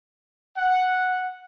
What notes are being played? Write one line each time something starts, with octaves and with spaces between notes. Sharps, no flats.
F#5